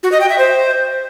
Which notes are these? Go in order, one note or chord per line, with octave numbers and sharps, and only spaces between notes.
F#4
D#5
G5
E5
C5